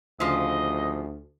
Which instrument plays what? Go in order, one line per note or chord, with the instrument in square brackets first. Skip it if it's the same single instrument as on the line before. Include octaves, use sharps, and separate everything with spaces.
[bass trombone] D2 [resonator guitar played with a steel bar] C#3 F3 [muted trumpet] D#5